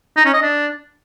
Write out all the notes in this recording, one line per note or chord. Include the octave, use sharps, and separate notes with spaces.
D#4
C#4
D#5
D4